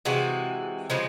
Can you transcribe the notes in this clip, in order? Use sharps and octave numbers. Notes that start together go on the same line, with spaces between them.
C3 E3 G#3 F#4
C#3 F3 G#3